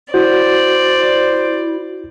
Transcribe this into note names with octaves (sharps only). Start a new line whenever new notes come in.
E4 F#4 C5 D5